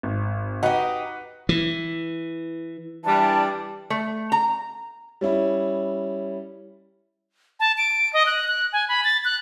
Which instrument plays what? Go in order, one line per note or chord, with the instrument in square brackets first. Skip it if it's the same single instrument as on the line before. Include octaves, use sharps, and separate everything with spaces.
[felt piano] G#1
[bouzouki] D#4 G4 [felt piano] F#4 B4 F#5
[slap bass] E3
[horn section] E3 G3 D4 [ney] A5
[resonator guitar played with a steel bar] A3
A#5
[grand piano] G3 C#4 E4
[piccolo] A5
D7
D#5
F#6
F#6
G#5
B5
A6
F#6